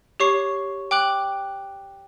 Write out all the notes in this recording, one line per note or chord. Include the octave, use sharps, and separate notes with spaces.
G4 C#5 C#6 C7
G5 D6 F#6 F#7